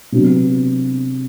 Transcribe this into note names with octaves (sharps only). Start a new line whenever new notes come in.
C3 F#3 B3 D4